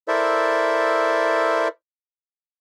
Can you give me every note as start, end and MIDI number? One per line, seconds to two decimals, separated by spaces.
0.08 1.68 64
0.08 1.68 69
0.08 1.68 70
0.08 1.68 72
0.08 1.68 74
0.08 1.68 76